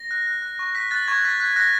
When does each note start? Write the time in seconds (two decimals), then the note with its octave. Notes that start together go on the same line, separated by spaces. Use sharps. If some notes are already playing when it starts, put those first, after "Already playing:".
Already playing: A#6
0.11 F#6
0.27 F#6
0.42 F#6
0.59 C#6
0.75 F#6 B6
0.91 F#6 A6
1.08 C#6 G#6
1.25 F#6 B6
1.40 F#6 B6
1.56 F#6 A#6